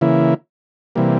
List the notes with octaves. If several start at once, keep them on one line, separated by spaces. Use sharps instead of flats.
C#3 E3 A#3 E4
C3 E3 G3 A#3